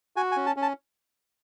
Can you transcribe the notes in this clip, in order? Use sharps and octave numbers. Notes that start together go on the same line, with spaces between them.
F#4 G#5
G#5
C#4
A5
C#4
A5